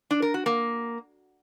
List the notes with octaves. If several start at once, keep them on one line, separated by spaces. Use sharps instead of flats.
D4
A#4
F#4
A#3